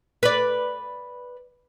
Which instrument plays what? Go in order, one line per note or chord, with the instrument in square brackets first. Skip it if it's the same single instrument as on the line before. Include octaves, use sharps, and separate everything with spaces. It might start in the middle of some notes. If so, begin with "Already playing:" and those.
[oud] B4 D5